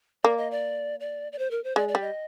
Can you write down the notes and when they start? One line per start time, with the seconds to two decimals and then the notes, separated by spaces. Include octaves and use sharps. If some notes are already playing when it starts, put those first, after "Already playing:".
0.24 A#3 D5
0.37 D#5
0.51 D5
1.00 D5
1.32 D5
1.39 C5
1.51 A#4
1.64 C5
1.76 G#3 D5
1.88 D5
1.95 G3
2.01 D#5